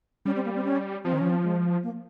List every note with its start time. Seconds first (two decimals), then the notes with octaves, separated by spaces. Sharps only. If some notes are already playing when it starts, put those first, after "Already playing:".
0.25 G3 C#4
0.35 C4
0.45 A#3
0.55 C4
0.65 C#4
1.05 F3 C4
1.13 D#3
1.18 F3 C#4
1.30 C4
1.43 G#3
1.83 A#3